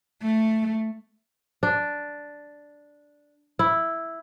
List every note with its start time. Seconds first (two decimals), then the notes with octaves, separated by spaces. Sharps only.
0.22 A3
1.63 D4
3.59 E4